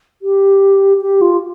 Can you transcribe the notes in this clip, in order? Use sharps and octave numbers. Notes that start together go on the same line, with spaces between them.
G4
G4
F4